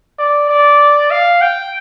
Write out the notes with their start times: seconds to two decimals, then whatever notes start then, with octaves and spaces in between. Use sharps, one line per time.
0.19 D5
0.49 D5
1.11 F5
1.42 G5